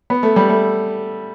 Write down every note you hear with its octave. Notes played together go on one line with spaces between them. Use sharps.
B3
A3
G3
A3